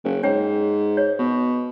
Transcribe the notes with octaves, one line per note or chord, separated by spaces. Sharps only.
F#1
G#2 C#5 G5
C#5
B2